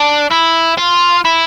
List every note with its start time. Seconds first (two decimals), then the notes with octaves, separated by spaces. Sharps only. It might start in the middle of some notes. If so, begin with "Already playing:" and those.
Already playing: D4
0.32 E4
0.78 F4
1.25 E4